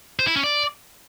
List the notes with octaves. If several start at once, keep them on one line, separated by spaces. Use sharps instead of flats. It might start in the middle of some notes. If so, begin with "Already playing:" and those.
C5
E4
C#4
D5